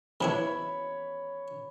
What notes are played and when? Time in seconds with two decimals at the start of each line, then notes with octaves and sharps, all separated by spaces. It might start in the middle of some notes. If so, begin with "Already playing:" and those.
0.21 C3 D4 E4 C#5 B5